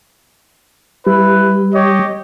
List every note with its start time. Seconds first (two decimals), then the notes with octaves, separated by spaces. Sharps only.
1.07 G3 E4 B4
1.74 G4 C#5 D#5